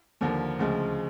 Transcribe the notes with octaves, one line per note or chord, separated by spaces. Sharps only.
D#2 D3 F3 A#3
D2 C#3 F3 G#3